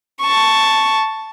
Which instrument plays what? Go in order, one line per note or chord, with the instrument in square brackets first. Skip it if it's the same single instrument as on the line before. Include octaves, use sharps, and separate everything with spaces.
[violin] A5 C#6